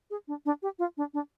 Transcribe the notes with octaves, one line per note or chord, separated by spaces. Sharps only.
G#4
D4
D4
G4
F4
D4
D4